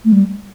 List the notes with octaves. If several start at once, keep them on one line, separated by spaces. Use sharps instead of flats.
A3
G3